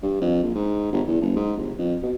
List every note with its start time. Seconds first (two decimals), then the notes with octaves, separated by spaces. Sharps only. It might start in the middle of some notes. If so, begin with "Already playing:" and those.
0.03 G2
0.21 F2
0.43 A#1
0.55 G#2
0.92 G1
1.07 E2
1.21 F#1
1.36 G#2
1.57 G1
1.78 F2
2.03 B2